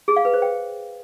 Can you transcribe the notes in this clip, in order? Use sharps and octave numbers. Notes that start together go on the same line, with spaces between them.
G#4
F5
B4
C5
G5